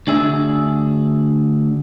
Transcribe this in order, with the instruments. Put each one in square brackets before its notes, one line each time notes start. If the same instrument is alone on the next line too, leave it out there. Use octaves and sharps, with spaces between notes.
[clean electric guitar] D2 D4 G#4 E5